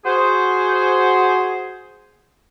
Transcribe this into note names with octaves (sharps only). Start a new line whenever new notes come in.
F#4 G#4 C5